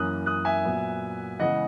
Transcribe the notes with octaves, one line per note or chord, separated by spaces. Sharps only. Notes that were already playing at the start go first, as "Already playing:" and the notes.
Already playing: F#2 E3 A#3 C#4 D#6 F#6
D#6 F#6
E5 G#5
A#2 F#3 B3
C#3 E3 G#3 B3 D#5 F#5